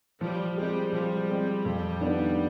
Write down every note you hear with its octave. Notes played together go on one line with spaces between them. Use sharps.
F3 G3
G3 G#3 C4
F3 G3
G#3 C4
F2
D#3 B3 D4